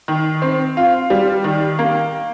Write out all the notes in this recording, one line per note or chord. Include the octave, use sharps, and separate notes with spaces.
D#3
C4
F4
G3
D#3
A#3